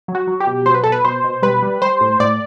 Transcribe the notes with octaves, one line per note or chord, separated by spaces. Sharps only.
F#3
F#4
F#3
G4
B2
F#3 C5
B4
B2 A4
B4
B2 C5
B2
G3 B4
G3
G3 C5
A2
A2 D5